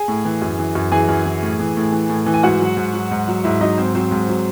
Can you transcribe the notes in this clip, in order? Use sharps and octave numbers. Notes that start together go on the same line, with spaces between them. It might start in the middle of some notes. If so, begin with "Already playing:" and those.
Already playing: G#4 G#5
A2
E3
F#2
E3
F#2
E3 G#4 G#5
F#2
E3
A2
E3
A2
E3
A2
E3
G#5
G#2 F#4 F#5
F#3
G#2
F#3
G#2
F#3
G#2 E4 E5
F#3 D#4 D#5
G#2 C4 C5
F#3 C4 C5
G#2
F#3